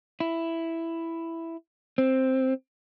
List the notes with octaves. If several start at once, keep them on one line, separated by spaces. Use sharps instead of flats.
E4
C4